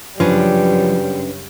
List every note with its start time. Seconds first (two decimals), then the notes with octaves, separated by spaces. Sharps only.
0.20 F#2 C#3 F3 G3 C#4 D4 B4